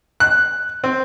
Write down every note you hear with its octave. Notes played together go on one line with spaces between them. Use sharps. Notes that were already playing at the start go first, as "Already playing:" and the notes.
F#6
C4